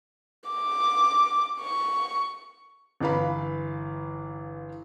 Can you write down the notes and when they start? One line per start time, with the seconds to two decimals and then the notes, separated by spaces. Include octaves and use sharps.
0.50 D6
1.61 C#6
3.00 G1 E3 B4 F5 B5